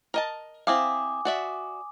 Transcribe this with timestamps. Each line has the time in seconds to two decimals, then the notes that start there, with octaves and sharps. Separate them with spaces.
0.14 A#4 D#5 A5
0.67 C4 E4 F5 G#5 D6 D#6
1.25 F#4 D5 E5